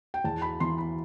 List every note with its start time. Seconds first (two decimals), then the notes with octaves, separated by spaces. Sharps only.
0.14 G5
0.24 E2 A5
0.42 B5
0.60 E3 C6
0.78 B5